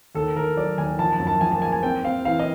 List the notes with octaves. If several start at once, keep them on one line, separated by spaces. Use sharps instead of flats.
D#2 A4
D#2 A#4
F#3 D5
D#2 G#5
F3 A5
A5
F#2
A5
F3 G#5
A5
A#3 G#5
G#5
C4 G5
C4 F5
E3 F5
D#5